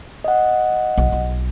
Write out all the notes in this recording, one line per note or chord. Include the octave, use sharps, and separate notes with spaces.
D#5 F#5
B1
B1